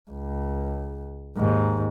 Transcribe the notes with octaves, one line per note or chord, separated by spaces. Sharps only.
C#2
D#2 G#2